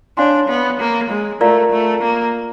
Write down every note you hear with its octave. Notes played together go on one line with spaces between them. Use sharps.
D4 C#5 F5 G#5 C6
B3
A#3
G#3
A3 F4 A#4 D5 F5 A#5
A3
A#3